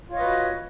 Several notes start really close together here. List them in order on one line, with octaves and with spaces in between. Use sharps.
F4 C#5 D#5 B4 F#4